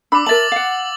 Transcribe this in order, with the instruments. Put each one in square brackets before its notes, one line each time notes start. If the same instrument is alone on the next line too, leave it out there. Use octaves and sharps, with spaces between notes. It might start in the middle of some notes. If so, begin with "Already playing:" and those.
[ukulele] D4 B5 [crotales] D6 E6
[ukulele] A#4 E5 A5 [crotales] A6 F#7
[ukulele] F5 F#5